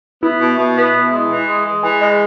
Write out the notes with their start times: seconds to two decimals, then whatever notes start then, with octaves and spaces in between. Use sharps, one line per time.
0.23 B3 E4
0.41 B2
0.58 B2
0.76 B3
0.94 B2
1.12 G#3
1.30 E3
1.47 G#3
1.65 G#3
1.83 E3 G#4
2.01 G#3